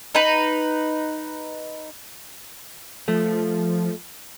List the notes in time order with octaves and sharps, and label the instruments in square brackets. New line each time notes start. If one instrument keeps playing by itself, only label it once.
[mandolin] D#4 B4
[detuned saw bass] F3 [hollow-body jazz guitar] A3